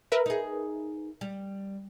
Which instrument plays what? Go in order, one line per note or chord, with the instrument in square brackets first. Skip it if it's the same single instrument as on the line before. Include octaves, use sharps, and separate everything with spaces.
[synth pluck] A#4 B4 E5
[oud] D#4 G#4
G3